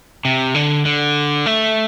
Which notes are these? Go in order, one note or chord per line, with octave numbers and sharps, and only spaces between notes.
C3
D3
D3
A3